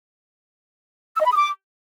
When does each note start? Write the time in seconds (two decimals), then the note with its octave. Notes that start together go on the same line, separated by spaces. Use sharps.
1.16 E6
1.21 D#5
1.26 B5
1.31 D#6
1.36 D6